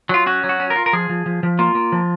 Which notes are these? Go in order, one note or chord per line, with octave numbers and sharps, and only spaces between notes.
F#3 F4
C#4 F#4
F#3
F#4
C#4
A#4
F4
A#4
F3 G#4
F3
F3
F3
A#3 F4
A#3
F3